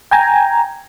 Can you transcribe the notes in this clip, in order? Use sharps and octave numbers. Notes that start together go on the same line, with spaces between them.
G5 G#5 A#5